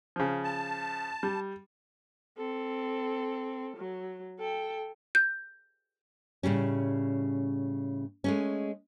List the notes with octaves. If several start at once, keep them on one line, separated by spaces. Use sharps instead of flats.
C#3 F3
A5
G3
C4 A4
F#3
A4 G5
G6
A2 C#3 G3 C#4
G#3 A3 C#4